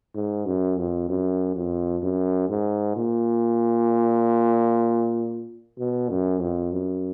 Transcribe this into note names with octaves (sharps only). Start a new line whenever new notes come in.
G#2
F#2
F2
F#2
F2
F#2
G#2
A#2
B2
F#2
F2
F#2